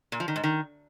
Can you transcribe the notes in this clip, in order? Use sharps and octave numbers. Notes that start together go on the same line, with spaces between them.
A#2
F3
D#3
G#2
D#3